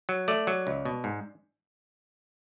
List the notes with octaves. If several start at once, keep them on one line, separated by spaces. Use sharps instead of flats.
F#3
A3 D5
F#3
C#2
B2
G#2